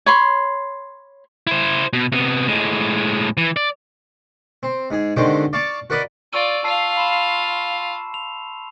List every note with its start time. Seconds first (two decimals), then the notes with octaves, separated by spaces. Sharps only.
0.06 C#5 B5 C6
1.47 E4 C5
1.93 B2
2.12 C3 B3
2.48 A2 G#3
3.37 E3
3.56 D5
4.63 C4
4.91 G#2 G#4
5.16 D3 D#3 G#3 C4 F#4 G4
5.53 D5 F5 A5 C#6 D6
5.90 F#4 A#4 B4 D5 D#5 B5
6.33 F4 D5 C#6 E6 D#7
6.64 F4 F5 A5 E6 C7
6.97 B5 C6 E7
8.14 F7